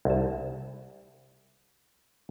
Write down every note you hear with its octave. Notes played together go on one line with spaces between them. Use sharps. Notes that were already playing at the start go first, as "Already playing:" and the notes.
C2 A5